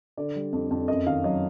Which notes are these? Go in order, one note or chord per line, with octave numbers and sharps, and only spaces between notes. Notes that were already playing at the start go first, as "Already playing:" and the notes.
D3 D5
G3
F2
F2
F#2 D#5
D#3 F5
F#3 D#5